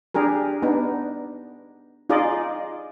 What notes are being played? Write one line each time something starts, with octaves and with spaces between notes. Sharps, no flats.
D4 G4 G#4 A#4
B3 D4 D#4
D#4 F4 G#4 D5 D#5